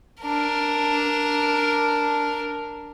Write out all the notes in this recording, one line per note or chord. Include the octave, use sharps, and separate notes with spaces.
D4 A#4